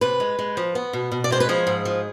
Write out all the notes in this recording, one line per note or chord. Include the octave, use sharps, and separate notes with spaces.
C3 B4
G#3
G#3
F3
B3
B2
B2
D5
G#3 C5
B4
F3 G#4
G#2
F3